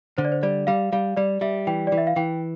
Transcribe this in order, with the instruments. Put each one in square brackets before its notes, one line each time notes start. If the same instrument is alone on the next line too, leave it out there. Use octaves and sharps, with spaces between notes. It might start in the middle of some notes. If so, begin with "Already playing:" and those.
[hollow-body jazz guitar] D3 [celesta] C5
[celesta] D5
C5
[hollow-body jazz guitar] G3 [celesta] D5
[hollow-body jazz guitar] G3 [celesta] F5
[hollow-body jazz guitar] G3 [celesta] F5
[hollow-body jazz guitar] G3 [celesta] D5
[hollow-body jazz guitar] G3 [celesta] E5
[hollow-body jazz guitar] E3 [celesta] G5
[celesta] D5
[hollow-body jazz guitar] E3
[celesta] E5
F5
[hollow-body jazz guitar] E3 [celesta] G5